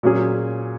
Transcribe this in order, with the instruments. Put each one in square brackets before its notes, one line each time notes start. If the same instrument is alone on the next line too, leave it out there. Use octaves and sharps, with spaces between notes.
[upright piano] A#2 F#3 C#4 G#4